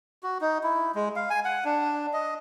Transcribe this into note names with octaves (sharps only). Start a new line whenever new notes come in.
F#4
D#4
E4
G#3
F5
G#5
F#5
D4
D#5